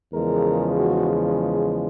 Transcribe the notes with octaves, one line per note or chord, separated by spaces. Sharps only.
E2 C#3 F3 G#3 A#4
F#4